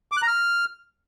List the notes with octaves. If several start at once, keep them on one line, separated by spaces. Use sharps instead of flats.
D6
F#6
A#5
F6